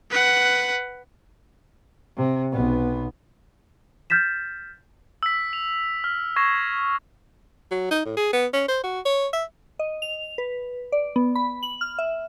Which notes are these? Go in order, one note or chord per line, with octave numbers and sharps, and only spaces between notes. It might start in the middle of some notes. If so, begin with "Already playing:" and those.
B4 F#5
C3
B1 B3
F6 G6 A6 B6 E7
E6 B6
F7
F6
C#6 G#6 A#6 C7 E7
F#3
D#4
A2
G#4
B3
C#4
C5
F#4
C#5
E5
D#5
F7
B4
D5
B3
B5
F#7
F6
E5